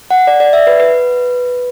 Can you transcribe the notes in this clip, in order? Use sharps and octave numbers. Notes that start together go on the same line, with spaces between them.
F#5
D5
D5
E5
B4
B4